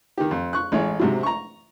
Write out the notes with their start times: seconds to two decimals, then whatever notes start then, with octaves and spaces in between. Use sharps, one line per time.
0.18 D#3 G4
0.31 F2
0.53 C#6 F#6
0.72 A1 G#3 C#5
1.00 G#2 C3 F#3
1.23 A#5 C#6